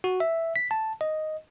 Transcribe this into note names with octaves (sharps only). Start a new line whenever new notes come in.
F#4
E5
B6
A5
D#5